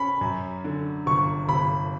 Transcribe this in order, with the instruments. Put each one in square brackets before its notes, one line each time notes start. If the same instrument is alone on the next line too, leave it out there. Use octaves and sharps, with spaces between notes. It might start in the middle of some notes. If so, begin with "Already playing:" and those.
Already playing: [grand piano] C#4 B5
F#2
D3
G1 C#6
G1 B5